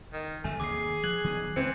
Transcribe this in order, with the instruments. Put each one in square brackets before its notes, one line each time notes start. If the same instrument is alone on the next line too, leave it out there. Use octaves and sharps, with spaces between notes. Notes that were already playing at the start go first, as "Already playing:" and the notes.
[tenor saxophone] D#3
[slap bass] G1 E2 B2 [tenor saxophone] A3 [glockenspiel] G#5
[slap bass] G#1 D#2 C3 [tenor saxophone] G#4 [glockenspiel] D6 C7
[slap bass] F3 [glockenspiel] F#6 G#6 F#7
[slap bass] D#3 F#3 B3
[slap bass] C#2 [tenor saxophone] E3 [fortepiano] C4 [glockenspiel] C#7